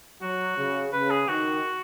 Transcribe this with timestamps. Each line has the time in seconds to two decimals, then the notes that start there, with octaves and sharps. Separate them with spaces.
0.22 F#3 F#4
0.58 C#3
0.93 C#3 B4
1.11 G#4
1.28 D#3 F#4